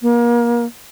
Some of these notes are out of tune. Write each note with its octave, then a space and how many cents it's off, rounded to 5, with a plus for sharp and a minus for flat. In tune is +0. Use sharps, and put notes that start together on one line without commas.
A#3 +30